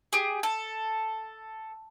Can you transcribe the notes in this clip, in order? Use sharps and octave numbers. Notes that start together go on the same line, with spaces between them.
G4 G#4
A4